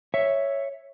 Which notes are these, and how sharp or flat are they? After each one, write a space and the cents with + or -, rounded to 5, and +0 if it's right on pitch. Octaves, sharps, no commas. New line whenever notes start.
C#5 +0 E5 +0